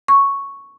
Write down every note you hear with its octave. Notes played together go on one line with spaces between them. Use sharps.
C#6